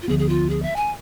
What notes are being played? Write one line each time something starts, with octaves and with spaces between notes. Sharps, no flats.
F4
D2 D3 F3 B3 G#4
G#4
F4
G#4
E5
G#5